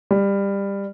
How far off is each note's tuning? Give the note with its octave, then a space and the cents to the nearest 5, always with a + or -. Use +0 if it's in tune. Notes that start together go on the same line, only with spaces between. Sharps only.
G3 +20